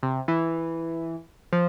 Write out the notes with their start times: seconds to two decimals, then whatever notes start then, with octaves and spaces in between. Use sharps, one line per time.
0.03 C3
0.28 E3
1.53 F3